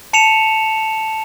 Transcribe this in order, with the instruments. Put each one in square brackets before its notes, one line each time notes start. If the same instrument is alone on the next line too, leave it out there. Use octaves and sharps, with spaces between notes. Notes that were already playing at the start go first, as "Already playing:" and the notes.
[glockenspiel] A5 C#7 E7 F7